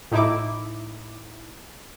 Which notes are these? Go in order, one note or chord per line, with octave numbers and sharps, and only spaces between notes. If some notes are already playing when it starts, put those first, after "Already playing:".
A2 D#4 E4 D6